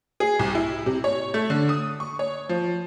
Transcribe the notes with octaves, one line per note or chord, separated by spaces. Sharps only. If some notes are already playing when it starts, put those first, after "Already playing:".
G#4
C2
E4
C3
C#5
A3
D3
D#6
C#6
C#5
F3